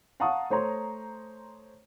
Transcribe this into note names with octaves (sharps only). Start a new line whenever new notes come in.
F5 F#5 A5 A#5 C#6 D#6
A3 C5 C#5 A#5 C6